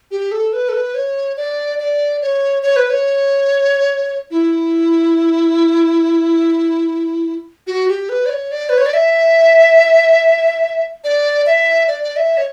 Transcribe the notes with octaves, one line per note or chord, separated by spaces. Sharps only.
G4
A4
B4
A4
B4
C#5
D5
D5
C#5
C#5
B4
C#5
E4
F#4
G4
B4
D5
C#5
D5
B4
C#5
D5
E5
D5
E5
D5
D5
E5
C#5